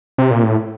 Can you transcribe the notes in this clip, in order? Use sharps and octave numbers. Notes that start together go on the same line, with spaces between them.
C3
A#2
A2